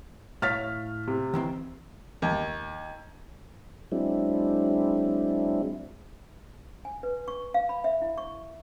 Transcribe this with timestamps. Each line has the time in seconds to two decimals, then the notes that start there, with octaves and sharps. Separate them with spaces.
0.42 A2 C#5 F5 F6 A6 B6
1.08 C3
1.34 D#3 E3 C4
2.22 D#2
3.92 F#3 G#3 C4 D4 E4
6.85 G#5
7.03 B4
7.28 C#6
7.54 F5
7.69 B5
7.84 E5
8.02 E4
8.18 C#6